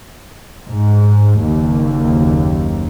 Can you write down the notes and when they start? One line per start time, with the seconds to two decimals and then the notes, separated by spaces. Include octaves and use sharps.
0.67 G#2
1.43 F#1 D#2